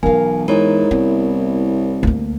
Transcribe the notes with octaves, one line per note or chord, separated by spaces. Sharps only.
B1 E3 B3 A#4 F5 G#5
G#2 E4 A#4 C#5 G#5
C2 B3
D2 A#3